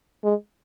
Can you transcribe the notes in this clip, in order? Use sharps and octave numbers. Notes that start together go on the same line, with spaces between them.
G#3